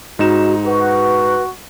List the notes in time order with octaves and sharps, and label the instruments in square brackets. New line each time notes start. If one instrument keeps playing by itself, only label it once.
[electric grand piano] G#2 D#4 E7 [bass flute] F#4
[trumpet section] F#4 [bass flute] B4